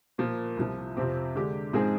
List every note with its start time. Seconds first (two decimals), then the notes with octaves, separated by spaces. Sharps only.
0.18 A#2 F3 A#3
0.57 C2 C3 F3
0.96 F2 C3 F3 C4 G4
1.35 D3 G#3 D4 G4
1.73 G#2 F3 C4 D#4 G#4